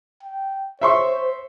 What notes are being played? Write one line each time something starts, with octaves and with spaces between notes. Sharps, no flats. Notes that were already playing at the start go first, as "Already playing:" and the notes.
G5
C5 C#5 E5 C6 C#6